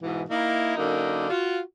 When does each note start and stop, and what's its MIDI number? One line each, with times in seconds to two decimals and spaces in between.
0.01 0.23 44
0.01 0.23 47
0.01 0.23 52
0.29 0.75 58
0.29 0.75 63
0.29 0.75 64
0.77 1.28 42
0.77 1.28 50
0.77 1.28 58
0.77 1.28 63
1.29 1.61 65
1.29 1.61 66